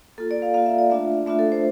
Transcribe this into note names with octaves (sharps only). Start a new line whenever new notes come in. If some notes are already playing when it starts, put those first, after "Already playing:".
A#3 F4 A4
D5
F5
A#3 F4 F5
E5
D5
A3 D4 F4 E5
A3 D4 F4 E5
A4
C5